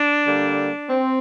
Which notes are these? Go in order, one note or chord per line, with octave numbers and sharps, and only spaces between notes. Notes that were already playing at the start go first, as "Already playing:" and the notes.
Already playing: D4
D3 G3 A#3
C4